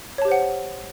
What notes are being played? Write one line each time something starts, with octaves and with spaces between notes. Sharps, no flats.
G4 C5 C#5 F#5 A5